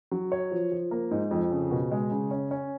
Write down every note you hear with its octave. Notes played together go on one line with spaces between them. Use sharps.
F#3
C#5
F3
F3
A#3
G#2
F2
C#3
B2
G#3
C#3
C#4
C#4